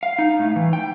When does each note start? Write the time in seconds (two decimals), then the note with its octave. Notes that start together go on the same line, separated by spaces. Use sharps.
0.03 F5
0.19 D#4
0.39 A2
0.56 E3
0.73 G5